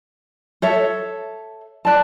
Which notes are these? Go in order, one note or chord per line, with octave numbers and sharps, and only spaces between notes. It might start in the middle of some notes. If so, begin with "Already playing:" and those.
A4 C#5 E5
B4 D5 A5